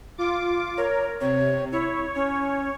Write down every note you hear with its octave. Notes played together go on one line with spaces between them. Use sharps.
F4 D6
A#4 C#5
C3 C#5
E4 C#5
C#4 C#5